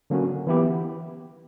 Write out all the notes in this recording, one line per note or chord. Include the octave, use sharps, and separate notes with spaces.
D3 F#3 A#3 C#4 F#4
E3 B3 E4 G4